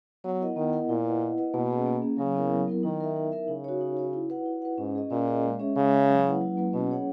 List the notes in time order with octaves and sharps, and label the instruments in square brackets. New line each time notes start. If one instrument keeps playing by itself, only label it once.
[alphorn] F#3 [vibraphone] B3
[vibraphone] E4 A#4 D#5 F#5
[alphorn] D#3 [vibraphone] B3
[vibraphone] E4 A#4 D#5 F#5
[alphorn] A#2 [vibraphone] E4
[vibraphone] B4 D#5 F#5
E4
B4 D#5 F#5
[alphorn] B2 [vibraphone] A#3
[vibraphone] C#4 G#4
A#3
C#4 G#4
[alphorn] C#3 [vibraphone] F#3
[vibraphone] B3 E4 A#4
F#3
B3 E4 A#4
[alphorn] D#3 [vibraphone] D#4
[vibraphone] A#4 E5
D#4
A#4 E5
[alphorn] C#3 [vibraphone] D#4
[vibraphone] F#4 C#5
D#4
F#4 C#5
E4
B4 F#5
E4
B4 F#5
[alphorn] G#2 [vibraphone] C#4
[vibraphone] G#4 D#5
[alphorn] A#2 [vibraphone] C#4
[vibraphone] G#4 D#5
G#3
C#4 G#4 C#5 E5
[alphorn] C#3 [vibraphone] G#3
[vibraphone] C#4 G#4 C#5 E5
F#3
A#3 E4 B4 F#5
F#3
A#3 E4 B4 F#5
[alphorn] B2 [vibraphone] C#4
[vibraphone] G#4 C#5 F#5